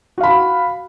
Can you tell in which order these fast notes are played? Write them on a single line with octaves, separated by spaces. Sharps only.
F#4 F5 B5